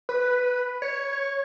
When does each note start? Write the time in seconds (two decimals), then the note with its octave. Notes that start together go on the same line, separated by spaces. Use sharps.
0.09 B4
0.82 C#5